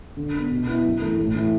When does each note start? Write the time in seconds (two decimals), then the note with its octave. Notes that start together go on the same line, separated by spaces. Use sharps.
0.17 D3
0.34 B3 D4
0.50 B2
0.67 B3 E4
0.84 F#2
1.01 E3 A3
1.19 A2
1.35 E3 A3